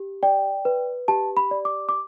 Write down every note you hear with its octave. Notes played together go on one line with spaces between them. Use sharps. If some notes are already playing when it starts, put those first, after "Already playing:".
Already playing: G4
D5 G5
B4
G4 A5
B5
D5
D6
D6